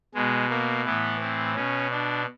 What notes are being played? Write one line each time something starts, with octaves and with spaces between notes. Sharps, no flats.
B2 G#3
A#3
A2 E3 B3
C4
B2 C#4
D4